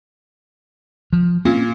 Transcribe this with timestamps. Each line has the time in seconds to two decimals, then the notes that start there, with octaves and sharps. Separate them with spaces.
1.13 F3
1.45 A#2 C4 C#4